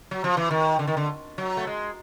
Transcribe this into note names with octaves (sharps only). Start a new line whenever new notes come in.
F#3
F3
E3
D#3
D3
D#3
D3
F#3
A3
G#3